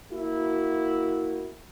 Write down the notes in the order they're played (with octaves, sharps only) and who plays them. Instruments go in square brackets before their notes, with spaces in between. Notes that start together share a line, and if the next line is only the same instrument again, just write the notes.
[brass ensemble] A#3 E4 F#4